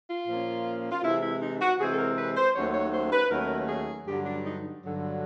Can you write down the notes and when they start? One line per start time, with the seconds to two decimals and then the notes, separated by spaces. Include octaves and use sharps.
0.09 F4
0.28 A#2 F3 A#3 C#4
0.92 F4
1.04 C3 E3 G#3 C4 E4
1.22 E4
1.42 D#4
1.61 F#4
1.80 C3 E3 G#3 C4 G#4
1.92 A4
1.98 A#4
2.17 B4
2.36 C5
2.55 D#2 D#3 F#3 A3 C#4 C#5
2.74 C#5
2.93 C5
3.12 B4
3.31 D#2 D#3 F#3 A3 C#4 A#4
3.69 G#4
4.07 G2 D3 F#3 G4
4.26 D4
4.45 D#4
4.83 G2 D3 F#3